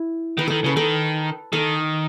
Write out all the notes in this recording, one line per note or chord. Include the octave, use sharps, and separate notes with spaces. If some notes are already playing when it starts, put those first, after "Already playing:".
Already playing: E4
D#3 B4
D#3 A4
C#3 B4
D#3 A4
D#3 A4